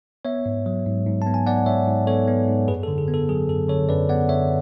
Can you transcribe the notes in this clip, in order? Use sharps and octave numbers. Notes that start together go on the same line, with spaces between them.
B3 C#5 E5
G#2
F#3
G#2
G#2
B3 A5
G#5
B3 D5 F#5
G#2 C#5 E5
G#2
B3 A4 C#5
B3
G#2
F#2 G#4 B4
A4
D3
G#4
B3
A4
F#3 G#4
F#2 A4
D3 A4 C#5
F#2 B4 D5
B3 D5 F#5
D3 C#5 E5